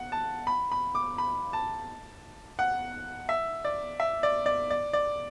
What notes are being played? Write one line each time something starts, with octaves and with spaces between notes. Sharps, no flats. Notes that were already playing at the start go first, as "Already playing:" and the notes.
Already playing: F#5
A5
B5
B5
D6
B5
A5
F#5
E5
D5
E5
D5
D5
D5
D5